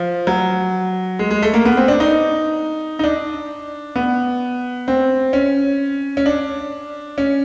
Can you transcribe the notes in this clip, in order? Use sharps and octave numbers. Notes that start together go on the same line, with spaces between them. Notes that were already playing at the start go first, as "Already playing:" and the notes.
Already playing: F3
F#3
G#3
G#3
A3
A#3
B3
C4
D4
D#4
D#4
D4
B3
C4
C#4
C#4
D4
C#4